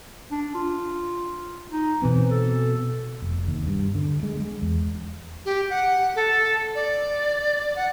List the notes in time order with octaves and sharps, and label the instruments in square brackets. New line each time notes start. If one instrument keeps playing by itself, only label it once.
[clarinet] D4
F4
D#4
[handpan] B2 B3 C4 [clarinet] E3
[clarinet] A4
[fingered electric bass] F1
D#2
G2
D3
G#3
G#3
E2
[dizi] G4
F#5
A4
D5
F#5